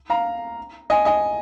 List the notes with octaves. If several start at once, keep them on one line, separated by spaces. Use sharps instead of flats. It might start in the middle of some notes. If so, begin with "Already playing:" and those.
F5 A#5
D#5 G#5
D#5 G#5